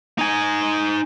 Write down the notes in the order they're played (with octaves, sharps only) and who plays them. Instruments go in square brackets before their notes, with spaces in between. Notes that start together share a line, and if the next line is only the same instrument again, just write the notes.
[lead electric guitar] D#4 G#5